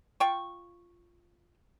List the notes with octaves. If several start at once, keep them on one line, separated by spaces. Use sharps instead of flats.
F4 G5 C#6